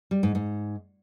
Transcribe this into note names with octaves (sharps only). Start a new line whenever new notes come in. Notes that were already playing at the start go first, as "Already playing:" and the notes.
G3
G#2
G#2